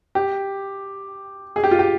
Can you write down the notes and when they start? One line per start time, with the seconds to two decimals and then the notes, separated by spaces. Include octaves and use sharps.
0.15 G4
1.56 G#4
1.64 G4
1.71 F4
1.79 G4